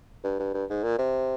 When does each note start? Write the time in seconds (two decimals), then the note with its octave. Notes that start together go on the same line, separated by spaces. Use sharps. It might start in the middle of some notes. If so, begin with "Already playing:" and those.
0.24 G2
0.40 G2
0.54 G2
0.70 G#2
0.83 A#2
0.98 C3